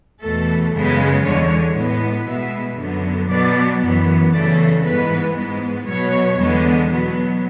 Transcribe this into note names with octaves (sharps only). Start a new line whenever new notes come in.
E2 B2 A3 A4
F#2 C#3 G#3 B3
E2 D3 G#3 C#5
A2 G#3 B3
B2 G#3 B3 E5
F#2 D3 F#3 B3
B2 F#3 B3 D5
F#2 E3 B3
F#2 C#3 E3 A3 D5
G#2 E3 G#3 B3 B4
G#2 G#3 B3
B2 F#3 B3 C#5
E2 D3 G#3 B3
B2 F#3 B3